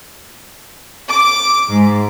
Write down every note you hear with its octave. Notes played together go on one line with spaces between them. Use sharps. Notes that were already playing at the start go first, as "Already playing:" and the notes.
D6
G#2